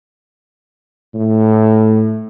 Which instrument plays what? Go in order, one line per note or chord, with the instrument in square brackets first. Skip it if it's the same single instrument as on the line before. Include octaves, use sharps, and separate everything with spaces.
[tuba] A2